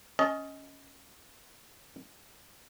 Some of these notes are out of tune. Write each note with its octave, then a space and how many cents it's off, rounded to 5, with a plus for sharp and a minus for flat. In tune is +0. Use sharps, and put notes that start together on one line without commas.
C#4 +0 D#5 +15 A5 -20